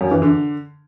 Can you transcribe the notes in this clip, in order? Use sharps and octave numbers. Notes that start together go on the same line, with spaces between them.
F#2
E3
D3